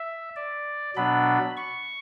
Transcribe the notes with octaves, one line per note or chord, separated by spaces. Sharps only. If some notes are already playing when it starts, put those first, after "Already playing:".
Already playing: E5
D5
B2 F#3 B3 D4 B5
C#6